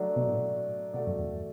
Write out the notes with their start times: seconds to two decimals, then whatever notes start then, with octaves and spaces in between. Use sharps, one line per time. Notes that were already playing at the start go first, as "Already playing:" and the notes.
Already playing: F#3 A3 D4
0.16 B2
0.28 A2
0.93 B2 A3 F#4 D5
1.07 F#2
1.19 E2